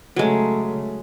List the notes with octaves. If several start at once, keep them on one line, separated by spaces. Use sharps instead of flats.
C#3 F#3 G#3 A3